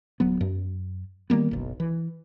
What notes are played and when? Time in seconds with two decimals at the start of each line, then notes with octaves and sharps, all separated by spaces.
0.20 D1 F#3 B3
0.41 F#2
1.30 D#3 G3 A#3 B3
1.51 F#1 B1
1.80 E3